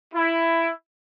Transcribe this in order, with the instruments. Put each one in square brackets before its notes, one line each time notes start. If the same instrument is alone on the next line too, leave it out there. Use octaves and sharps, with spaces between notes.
[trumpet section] E4